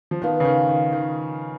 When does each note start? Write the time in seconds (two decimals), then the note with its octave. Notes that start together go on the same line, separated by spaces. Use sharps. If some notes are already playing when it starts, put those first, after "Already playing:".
0.11 F3
0.22 D#3 F3 B3 F4 B4
0.40 C#3
0.45 D#3
0.69 D#3
0.92 D#3